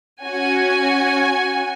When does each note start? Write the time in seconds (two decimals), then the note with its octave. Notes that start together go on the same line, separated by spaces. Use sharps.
0.22 C#4 F#4 G#5